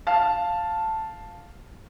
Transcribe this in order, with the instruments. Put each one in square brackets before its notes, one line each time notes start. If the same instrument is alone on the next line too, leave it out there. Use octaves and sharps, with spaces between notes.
[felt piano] F5 A5